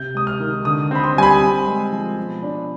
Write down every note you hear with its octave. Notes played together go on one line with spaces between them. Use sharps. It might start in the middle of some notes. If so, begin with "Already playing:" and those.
Already playing: C3 G6
G#3 D#6
F6
D#3
D3 D#6
C4 B5
C6
G3 G#5
B5
C4
G#3
F3
B2
D4